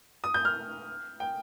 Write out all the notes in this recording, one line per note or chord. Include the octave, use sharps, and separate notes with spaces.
D#6
G6
F6
G5